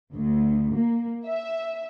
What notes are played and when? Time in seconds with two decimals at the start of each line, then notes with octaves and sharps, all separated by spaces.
0.12 D2
0.74 A#3
1.27 E5